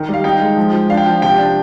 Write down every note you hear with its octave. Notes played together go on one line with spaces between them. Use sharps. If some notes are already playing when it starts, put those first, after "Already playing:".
Already playing: D#3
G3 F5
D#4 G5
G#3
F3
F3
D4 F5
G5
F3
C3 G5
D4